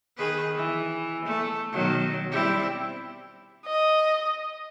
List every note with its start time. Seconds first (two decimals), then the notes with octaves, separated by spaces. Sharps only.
0.17 D#3 G#4 B4
0.55 E3
1.25 A3
1.72 B2 D#3 F#3
2.32 G3 C4 E4
3.66 D#5